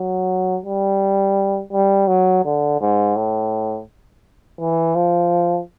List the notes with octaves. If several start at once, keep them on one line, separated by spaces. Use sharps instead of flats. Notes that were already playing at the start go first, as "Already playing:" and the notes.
Already playing: F#3
G3
G3
F#3
D3
G#2
A2
E3
F3